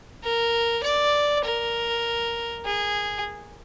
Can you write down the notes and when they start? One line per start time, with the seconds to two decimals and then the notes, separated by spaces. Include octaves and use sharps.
0.24 A#4
0.83 D5
1.44 A#4
2.65 G#4